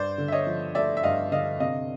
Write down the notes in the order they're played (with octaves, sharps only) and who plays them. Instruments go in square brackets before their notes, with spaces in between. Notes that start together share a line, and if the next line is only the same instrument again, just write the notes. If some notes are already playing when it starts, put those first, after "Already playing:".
Already playing: [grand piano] G2 C5 D5
D3
E5
C#5 D#5
F3
A3 D5 E5
E5
G2 D#5 F5
D3 D#5 F5
C3 D#5 F5